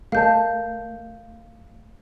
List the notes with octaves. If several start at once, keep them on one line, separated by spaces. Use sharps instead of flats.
A3 A#4 D#5 F5 A5 G6